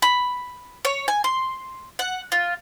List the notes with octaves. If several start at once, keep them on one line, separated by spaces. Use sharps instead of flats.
B5
C#5
G#5
C6
F#5
F4